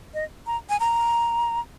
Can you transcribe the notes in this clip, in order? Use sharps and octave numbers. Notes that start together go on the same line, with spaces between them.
D#5
A#5
G#5
A#5